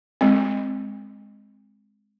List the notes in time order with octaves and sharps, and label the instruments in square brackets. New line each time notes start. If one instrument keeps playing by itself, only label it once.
[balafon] G#3 C4